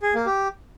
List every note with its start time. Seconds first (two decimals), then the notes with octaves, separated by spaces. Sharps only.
0.03 G#4
0.14 A#3
0.26 G4